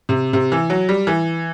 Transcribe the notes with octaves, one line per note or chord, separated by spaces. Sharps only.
C3
C3
E3
F#3
G3
E3